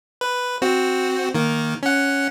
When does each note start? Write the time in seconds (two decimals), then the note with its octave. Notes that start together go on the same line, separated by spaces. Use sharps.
0.21 B4
0.62 C4 F#4
1.34 D#3 A#3
1.83 C#4 F#5